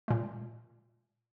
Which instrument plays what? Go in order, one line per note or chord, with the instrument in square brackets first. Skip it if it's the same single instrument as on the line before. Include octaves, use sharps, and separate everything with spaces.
[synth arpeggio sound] A#2 G#3